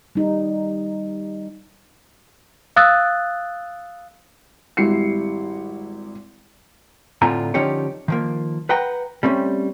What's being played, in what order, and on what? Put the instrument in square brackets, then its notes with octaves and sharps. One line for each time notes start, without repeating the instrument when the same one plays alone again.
[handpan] G3 D#4
[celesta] F5 D#6 E6 F#6 A6
[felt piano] G#1 G3 E4 C7 C#7
[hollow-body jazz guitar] A2 D3 C4 F4 G#5 A#5
D3 F3 C#4 D#4 G4 C#5
D#3 F3 A#3
B4 F#5 G5 A#5
G3 A3 C4 C#4